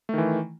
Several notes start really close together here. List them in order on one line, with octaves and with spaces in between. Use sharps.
A3 D#3 E3